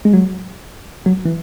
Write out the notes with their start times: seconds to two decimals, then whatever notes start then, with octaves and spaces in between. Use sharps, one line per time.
0.05 G#3
0.13 F#3
1.06 F#3
1.25 E3